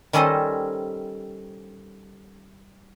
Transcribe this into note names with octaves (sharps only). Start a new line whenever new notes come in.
D#3 G3 C#4 A4 C5 D#5